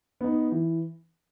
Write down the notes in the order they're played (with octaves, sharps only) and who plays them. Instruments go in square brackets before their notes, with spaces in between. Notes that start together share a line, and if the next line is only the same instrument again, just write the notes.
[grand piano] B3 D#4
E3